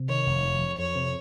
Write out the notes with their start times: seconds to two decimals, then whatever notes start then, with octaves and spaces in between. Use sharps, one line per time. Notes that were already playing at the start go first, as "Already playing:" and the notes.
Already playing: C3
0.09 D#3 C#5
0.27 F1
0.44 F2
0.61 F2
0.78 F2 C#5
0.96 C3